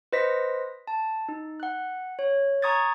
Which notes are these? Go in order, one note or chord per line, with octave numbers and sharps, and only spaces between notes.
B4 C5 D#5 A#6 B6
A5
D#4
F#5 F#6
C#5
A#5 C#6 D#6 G#6 A6